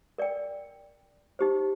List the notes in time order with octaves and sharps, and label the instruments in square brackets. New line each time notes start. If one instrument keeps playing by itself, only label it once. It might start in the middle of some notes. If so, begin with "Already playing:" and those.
[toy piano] A#4 D5 G5
D#4 G4 C5